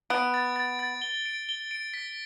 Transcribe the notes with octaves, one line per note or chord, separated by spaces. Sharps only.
B3 D7
A6
A6
A6
G7
D7
G7
D7
B6